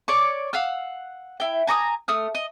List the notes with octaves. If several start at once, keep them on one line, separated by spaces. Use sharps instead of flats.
C#5 D5 C#6
F5 F#5 E6 F6
E4 G5
G#5 A#5 C#6 D#6
A3 D#6 F6
D#5